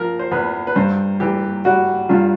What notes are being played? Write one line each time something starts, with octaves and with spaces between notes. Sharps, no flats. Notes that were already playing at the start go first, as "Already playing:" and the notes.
Already playing: F3 A#4
C5
E2 B4
B4
G2 C5
E3 G4
G3 F#4
G2 F4